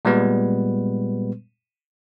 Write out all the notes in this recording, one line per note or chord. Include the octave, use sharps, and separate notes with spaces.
A#2 G3 G#3 B3 B4